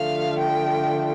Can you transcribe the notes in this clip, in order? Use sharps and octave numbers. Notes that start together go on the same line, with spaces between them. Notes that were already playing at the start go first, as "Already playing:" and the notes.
Already playing: D3 F3 A3 F5
G5